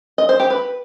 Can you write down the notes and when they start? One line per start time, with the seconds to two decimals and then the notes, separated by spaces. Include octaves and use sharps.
0.18 D#5
0.29 C5
0.40 G4
0.50 B4